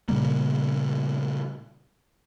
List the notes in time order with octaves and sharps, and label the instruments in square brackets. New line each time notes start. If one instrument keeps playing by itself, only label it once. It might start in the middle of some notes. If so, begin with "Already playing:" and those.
[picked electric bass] A#2 C#3 G3 A#3